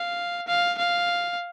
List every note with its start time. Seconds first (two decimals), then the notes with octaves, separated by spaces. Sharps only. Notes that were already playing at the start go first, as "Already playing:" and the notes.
Already playing: F5
0.48 F5
0.78 F5